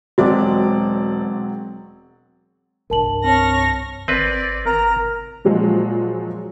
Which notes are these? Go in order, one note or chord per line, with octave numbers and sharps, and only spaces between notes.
E1 F#3 G#3 C4 F#4 C5 D5 D6
C2 G2 A#4 A5 F#7
C4 C#5 A5 C#6 F6 A#6
G#1 C4 B4 D5
G#1 A#4 A#5
A#2 F3 F#3 G#3